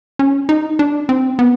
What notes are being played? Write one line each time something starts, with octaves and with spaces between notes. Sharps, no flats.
C#4
D#4
D4
C4
B3